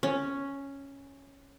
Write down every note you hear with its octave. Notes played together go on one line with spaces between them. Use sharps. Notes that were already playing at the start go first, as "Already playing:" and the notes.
C#4